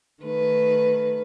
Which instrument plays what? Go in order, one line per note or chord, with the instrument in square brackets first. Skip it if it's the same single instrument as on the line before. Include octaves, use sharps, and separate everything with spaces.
[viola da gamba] D#3 A3 B4